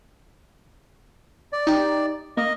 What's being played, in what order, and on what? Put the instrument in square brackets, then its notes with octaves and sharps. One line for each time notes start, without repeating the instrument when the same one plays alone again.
[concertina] D5
[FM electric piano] D#4 G4
[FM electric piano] A#3 [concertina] D#5